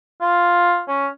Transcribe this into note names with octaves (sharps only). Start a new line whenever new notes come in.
F4
C#4